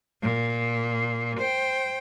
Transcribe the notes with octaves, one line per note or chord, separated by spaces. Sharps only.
A#2
C5 G5